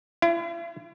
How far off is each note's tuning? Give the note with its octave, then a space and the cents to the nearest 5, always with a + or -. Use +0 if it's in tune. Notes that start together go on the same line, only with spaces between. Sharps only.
E4 +40